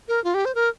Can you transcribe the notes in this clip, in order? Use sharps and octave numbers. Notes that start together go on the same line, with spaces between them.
A#4
F4
G4
C5
A#4